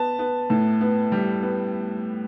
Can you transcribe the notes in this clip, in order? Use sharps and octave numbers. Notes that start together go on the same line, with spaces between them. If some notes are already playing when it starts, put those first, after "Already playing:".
Already playing: B3 A5
B3
A2
B3
G3
B3